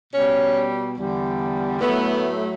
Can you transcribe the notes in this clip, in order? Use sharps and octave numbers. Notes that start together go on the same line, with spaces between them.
B2 G3 C#4
E2 D3 G3
A2 F#3 A3 B3